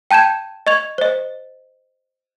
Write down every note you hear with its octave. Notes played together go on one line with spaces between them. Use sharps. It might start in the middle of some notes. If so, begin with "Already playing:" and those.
G5 A5 G6 G#6 E7
D#5 C#6 G#6 F7
C5 D#5